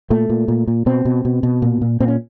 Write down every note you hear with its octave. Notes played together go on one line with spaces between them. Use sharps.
A#2 A3
A#2
A#2
A#2
B2 C4
B2
B2
B2
A#2
A#2
A#2 C4
C#4